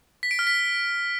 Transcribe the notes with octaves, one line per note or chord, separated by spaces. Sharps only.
B6
D7
F6
B6